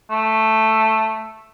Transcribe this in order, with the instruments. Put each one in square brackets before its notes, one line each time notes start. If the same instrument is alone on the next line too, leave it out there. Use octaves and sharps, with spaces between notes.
[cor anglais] A3